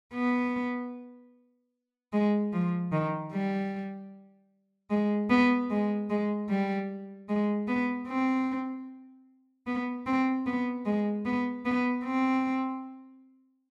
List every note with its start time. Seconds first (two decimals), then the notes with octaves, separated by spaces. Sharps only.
0.14 B3
2.13 G#3
2.53 F3
2.92 D#3
3.33 G3
4.90 G#3
5.30 B3
5.70 G#3
6.10 G#3
6.49 G3
7.29 G#3
7.68 B3
8.08 C4
9.67 B3
10.06 C4
10.46 B3
10.86 G#3
11.25 B3
11.65 B3
12.05 C4